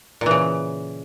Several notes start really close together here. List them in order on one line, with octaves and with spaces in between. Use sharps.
A#2 E3 C#3